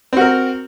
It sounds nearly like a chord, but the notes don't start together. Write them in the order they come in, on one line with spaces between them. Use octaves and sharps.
C4 F#4 A#4